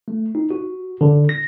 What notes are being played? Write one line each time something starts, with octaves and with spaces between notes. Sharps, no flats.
A3
D#4
F#4
D3
A#6